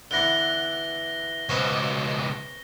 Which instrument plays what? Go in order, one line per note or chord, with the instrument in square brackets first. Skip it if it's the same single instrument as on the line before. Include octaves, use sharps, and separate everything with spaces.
[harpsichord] D3 E3 B3 [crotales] A#6 G7
[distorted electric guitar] C#2 B2 [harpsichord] C#4 B4 C5